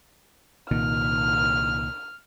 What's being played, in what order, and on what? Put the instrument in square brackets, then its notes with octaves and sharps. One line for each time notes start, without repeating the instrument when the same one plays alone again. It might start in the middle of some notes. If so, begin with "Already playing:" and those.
[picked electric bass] C2 A#2 D#3 [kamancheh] F6